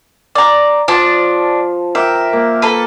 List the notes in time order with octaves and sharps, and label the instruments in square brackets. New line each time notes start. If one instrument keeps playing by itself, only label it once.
[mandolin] D5 A#5
[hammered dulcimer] F3 [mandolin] D4 A5
[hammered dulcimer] A#4 G5 D6 [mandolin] E5
[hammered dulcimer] A#3
[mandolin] A4 B4